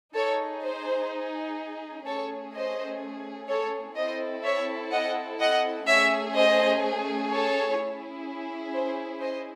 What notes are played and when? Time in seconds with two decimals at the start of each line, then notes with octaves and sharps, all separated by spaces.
0.15 D#4 G#4 A4 C#5
0.63 C5
2.05 A3 C#4 G#4 A4 C#5
2.54 C5 D#5
3.49 A4 C#5
3.96 C4 E4 A4 C5 D#5
4.44 C#5 E5
4.92 D#5 F#5
5.39 D#5 F#5
5.87 A3 C#4 G#4 C#5 E5
6.35 C5 D#5
7.30 A4 C#5
7.78 C#4 E4 G#4
8.74 C5
9.21 C5 D#5